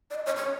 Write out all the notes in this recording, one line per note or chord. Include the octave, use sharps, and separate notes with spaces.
D5
D#5
C#5
C#5